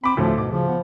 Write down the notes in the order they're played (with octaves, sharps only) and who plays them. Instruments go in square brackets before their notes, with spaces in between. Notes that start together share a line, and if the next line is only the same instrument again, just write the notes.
[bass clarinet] C4 [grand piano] B5 D6
[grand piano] D2 A3 [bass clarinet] A2 [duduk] F3
[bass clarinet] G#2 [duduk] B2 [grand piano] D6
[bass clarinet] C#3 [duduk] F3
[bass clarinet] B3